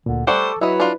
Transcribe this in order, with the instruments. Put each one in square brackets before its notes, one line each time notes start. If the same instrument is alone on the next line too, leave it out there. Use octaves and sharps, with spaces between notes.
[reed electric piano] D2 A#2 [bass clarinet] D3
[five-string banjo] G3 A3 F#5 [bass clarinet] A4 [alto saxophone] C5 [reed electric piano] C#6 D6
[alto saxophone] F#3 [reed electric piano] E4 [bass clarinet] B4 [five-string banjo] D#5 E5
[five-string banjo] D4 F4